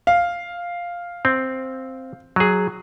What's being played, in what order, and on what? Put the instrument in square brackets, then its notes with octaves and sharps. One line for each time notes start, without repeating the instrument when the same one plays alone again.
[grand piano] F5
[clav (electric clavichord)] C4
F#3 G#4